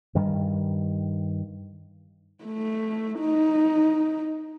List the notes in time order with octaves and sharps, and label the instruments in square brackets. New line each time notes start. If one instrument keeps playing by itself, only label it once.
[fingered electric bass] G2 D#3 G3
[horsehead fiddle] A3
D#4